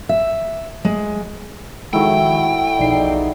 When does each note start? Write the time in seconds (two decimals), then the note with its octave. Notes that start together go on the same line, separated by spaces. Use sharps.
0.09 E5
0.85 G#3
1.93 D#3 F3 F#3 G#3 A3 E4 G5
2.79 B1 E2 F3 D#4 D5 C7